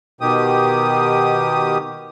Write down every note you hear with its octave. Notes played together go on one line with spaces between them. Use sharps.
B2 D#3 G4 D#6